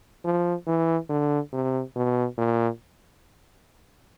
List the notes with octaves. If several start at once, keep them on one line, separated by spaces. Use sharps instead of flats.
F3
E3
D3
C3
B2
A#2